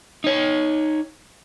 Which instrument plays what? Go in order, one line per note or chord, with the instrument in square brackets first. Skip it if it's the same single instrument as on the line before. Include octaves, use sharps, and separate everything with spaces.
[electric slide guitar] D#4 C#5